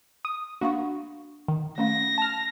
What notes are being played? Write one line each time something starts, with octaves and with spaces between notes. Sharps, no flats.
D#6
A#3 D4 F#4 F5 C#6
D#3
A3 C#4 F5 A#6
A5 F6